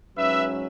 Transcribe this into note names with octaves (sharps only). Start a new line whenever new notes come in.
G#2 F#3 C#4 B4 E5